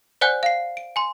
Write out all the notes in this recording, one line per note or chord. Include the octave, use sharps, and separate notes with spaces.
C5 D5 F#5 G#5 F#6 G6
F5 C7
D7
G#5 C6